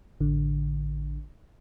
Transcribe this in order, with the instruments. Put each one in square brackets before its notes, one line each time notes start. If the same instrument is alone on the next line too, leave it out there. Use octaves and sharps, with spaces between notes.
[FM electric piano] A1 D3